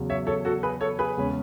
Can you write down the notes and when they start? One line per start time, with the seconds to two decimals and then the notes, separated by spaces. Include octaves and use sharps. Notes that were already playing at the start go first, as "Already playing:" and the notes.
Already playing: E2 C#3 F#3
0.10 C#5 E5
0.27 A4 C#5
0.45 F#4 A4
0.63 G#4 B4
0.81 A4 C#5
0.99 G#4 B4
1.17 E2 C#3 G#3 C#4